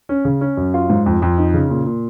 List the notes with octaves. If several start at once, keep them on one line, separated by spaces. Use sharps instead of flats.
C#4
C#3
C#4
F#2
F4
G#2
F2
F2
D#4
C#3
A#2
A#2